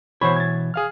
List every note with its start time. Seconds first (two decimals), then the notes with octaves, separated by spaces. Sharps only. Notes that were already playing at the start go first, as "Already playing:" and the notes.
0.21 B2 E3 C5 C#5 B5
0.36 G#6 A6
0.74 G#4 F5 F6